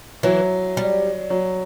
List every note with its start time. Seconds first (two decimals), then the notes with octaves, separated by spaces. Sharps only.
0.23 E3 F#3
0.77 G3
1.30 F#3